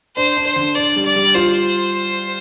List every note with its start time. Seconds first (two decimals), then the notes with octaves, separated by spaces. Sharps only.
0.17 D4 C5
0.37 D4
0.46 C5
0.56 D3
0.75 D4 D5
0.96 G3
1.05 D5
1.16 G3
1.35 F4 C5